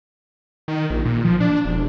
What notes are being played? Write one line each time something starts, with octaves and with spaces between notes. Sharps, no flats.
D#3
A#1
A#2
F3
D4
E1